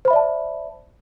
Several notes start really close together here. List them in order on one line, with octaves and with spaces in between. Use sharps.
C5 B5 E5 D5 A5